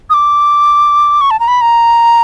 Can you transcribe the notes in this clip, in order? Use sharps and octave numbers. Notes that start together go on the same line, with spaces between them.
D#6
D6
C#6
A5
A#5
B5
A#5